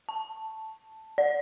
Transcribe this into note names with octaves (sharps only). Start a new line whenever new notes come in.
A5
D5